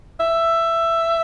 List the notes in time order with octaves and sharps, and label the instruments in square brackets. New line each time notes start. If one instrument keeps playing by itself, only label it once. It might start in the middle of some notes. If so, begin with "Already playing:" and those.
[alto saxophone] E5